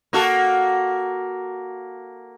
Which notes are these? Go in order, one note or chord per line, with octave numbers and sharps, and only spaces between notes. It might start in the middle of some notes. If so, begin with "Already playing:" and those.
A#3 F#4 A4